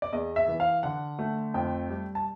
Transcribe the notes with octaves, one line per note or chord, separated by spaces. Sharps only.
D5
E2 D#5
E5
E3
F5
D3 F#5
A3
F2 G5
G3
A5